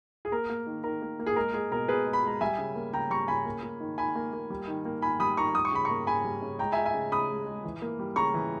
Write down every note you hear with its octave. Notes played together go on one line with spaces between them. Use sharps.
G#4
A#3 A#4
A#3
D#3
D#3 A#4
A#3
A#3
G#4
G#3 A#4
G#3 G#4
B2 A#4
B2 G#4 B4
G#3
B5
G#3 A#5
G3 E5 G#5
C#3
A#3
C#3 G5 A#5
G3 A#5 C#6
C#3 G#5 B5
A#3
A#3
D#3
D#3 G#5 B5
A#3
A#3
G3
D#3
A#3
D#3 G#5 B5
G3 B5 D#6
D#3 A#5 C#6
G3 D#6
C#6
C#3 B5
A#3 A#5 C#6
C#3 G#5 B5
G3
C#3
G#3 G5 A#5
E5 G#5
G#3
E5 G#5
C#3
C#3 B5 D#6
G#3
G#3
E3
A#3
G3
C#3 A#5 C#6
E3